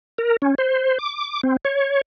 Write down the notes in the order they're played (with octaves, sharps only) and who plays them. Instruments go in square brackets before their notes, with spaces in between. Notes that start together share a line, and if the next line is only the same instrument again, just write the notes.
[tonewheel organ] A#4
C#4
C5
D6
C4
C#5